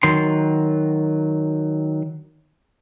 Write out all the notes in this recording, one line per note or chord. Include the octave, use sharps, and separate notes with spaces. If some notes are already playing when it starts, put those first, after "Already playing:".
D#3 F#3 C6